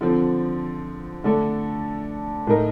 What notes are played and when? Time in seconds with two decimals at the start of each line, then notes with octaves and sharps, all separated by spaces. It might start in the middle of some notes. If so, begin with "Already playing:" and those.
0.01 D3 F3 C4
1.24 D3 A3 D4 A4
2.47 A2 A3 D#4 A#4